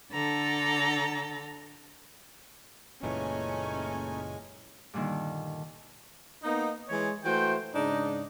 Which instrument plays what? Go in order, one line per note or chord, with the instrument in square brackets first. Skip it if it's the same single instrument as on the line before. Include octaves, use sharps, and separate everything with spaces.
[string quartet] D3 A4 A#5
[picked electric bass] F#1 A#2 E3 [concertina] G#3 G#5 [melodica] A3 D#4 [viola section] C#4
[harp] G2 A#2 D3 D#3
[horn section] A#3 B3 D#4
E3 G#3 C#5
E3 A3 F#4 C5 G5
G#2 C#3 D4 D#4